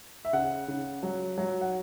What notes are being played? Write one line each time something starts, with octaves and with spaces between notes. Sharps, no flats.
E5
C#3 F#5
C#3
F#3
F#3
F#5